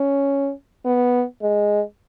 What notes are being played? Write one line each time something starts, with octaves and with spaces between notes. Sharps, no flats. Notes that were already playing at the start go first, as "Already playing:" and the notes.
Already playing: C#4
B3
G#3